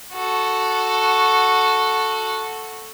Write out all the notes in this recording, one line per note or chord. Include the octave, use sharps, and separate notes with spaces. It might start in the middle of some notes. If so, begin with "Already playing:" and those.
F#4 A4